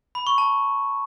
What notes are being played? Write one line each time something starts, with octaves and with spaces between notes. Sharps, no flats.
B5
C#6
A5